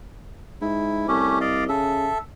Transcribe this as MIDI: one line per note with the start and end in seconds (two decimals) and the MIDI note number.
0.61 1.08 44
0.61 1.07 64
1.08 1.66 36
1.08 1.39 57
1.08 1.39 61
1.08 1.39 67
1.41 1.64 74
1.41 1.64 75
1.41 1.64 77
1.69 2.09 49
1.69 2.18 69
1.69 2.18 76